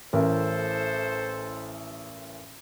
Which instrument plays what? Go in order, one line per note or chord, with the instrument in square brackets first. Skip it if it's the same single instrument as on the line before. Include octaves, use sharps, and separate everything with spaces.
[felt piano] A1 E3 A#4 [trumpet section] A4 C5